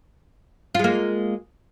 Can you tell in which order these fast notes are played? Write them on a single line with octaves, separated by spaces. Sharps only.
F4 G#3 A#3